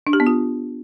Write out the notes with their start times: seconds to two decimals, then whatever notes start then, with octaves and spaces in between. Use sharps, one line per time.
0.07 D4
0.13 G4
0.20 B3
0.27 F4